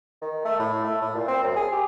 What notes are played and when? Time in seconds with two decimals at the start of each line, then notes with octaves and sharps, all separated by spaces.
0.22 D#3
0.45 A3
0.60 A2
0.84 A3
1.02 A2
1.15 A#2
1.28 C4
1.43 F#2
1.56 G#4
1.72 G4